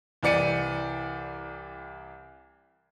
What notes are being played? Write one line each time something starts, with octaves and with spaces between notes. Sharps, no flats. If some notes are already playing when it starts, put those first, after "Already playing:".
C2 E3 D5 C#7 D#7